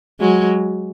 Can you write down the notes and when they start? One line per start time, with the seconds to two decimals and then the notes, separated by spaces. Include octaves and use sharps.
0.20 F#3 G#3